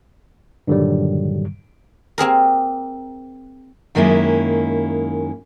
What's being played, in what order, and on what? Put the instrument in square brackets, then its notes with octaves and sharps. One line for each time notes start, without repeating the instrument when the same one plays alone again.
[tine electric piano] G2 A#2 D3 D#3 F#3 G3
[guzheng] A#3 C4 G#4 A#4
[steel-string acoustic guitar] F#2 D#3 G#3 A#3 C#4 E4